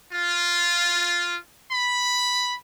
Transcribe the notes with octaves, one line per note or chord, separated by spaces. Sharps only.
F4
B5